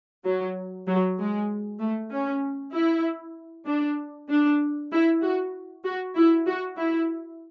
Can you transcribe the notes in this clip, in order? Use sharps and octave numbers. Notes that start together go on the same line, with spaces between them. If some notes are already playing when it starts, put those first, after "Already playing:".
F#3
F#3
G#3
A3
C#4
E4
D4
D4
E4
F#4
F#4
E4
F#4
E4